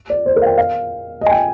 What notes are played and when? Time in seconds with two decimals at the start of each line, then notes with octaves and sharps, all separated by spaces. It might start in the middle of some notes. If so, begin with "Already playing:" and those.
0.10 D5
0.26 C5
0.36 A#4
0.42 F5
0.47 G5
0.58 F5
1.21 D#5
1.26 G#5
1.31 G5